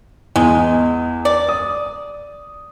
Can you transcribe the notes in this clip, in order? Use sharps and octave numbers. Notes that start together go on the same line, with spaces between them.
E2 G#3
D5
D#6